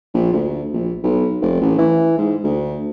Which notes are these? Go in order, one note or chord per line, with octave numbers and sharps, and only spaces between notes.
A#1
D2
A#1
B1
F1
A1
E3
G#2
D2